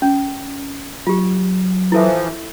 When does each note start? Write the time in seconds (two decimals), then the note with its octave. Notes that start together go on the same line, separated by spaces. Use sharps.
0.02 C#4
1.07 F#3 F4 G4
1.92 E3 F3 E4 A4 E5